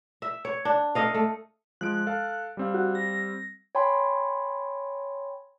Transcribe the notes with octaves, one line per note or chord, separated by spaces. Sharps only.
E5
C#5
D4
A3 D#5 F5
A3
F3 G#3 F#6 D7
A4 F5
G3 C4 F5
F#4
A#6
C#5 G5 G#5 B5 C6